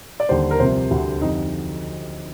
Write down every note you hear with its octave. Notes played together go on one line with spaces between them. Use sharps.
D5
D#2 D3 G3 C5
A#4
C2 C3 F3 C5
D2 D3 G3
F2 D3 G3 D#4